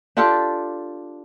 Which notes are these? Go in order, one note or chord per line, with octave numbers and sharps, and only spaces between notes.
D4 F4 G4 A4